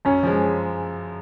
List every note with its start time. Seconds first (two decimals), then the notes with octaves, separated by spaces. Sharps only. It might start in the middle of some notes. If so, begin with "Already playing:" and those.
0.05 F#2 C#4
0.23 F3 G#3